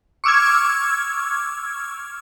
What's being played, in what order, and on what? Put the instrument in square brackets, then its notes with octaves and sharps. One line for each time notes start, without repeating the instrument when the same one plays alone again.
[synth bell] C#6 D6 E6 F6 G#6